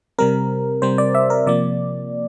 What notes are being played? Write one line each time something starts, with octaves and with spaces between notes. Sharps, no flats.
C3 G3 C4 A#4
C3 G3 C4 C5
D5
E5
A#4
C3 F3 A#3 D5